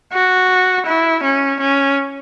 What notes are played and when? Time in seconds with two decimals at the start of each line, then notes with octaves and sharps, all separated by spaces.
0.12 F#4
0.86 E4
1.23 C#4
1.60 C#4